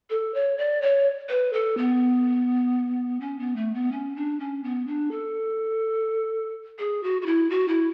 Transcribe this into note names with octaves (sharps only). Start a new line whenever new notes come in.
A4
C#5
D5
C#5
B4
A4
B3
C#4
B3
A3
B3
C#4
D4
C#4
B3
D4
A4
G#4
F#4
F#4
E4
F#4
E4